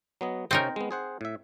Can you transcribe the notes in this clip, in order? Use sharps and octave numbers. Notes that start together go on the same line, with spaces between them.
F#3 B3 D#5
C3 C4 C#4 D#4 A#4
G#3 B3
G#4 C5 F#5
A2 E5